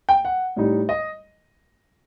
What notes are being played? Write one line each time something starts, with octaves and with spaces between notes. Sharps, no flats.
G5
F#5
A2 G3 D#4
D#5